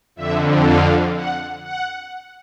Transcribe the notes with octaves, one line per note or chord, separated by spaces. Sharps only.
F2 D3 E5
F5
F#5
F#5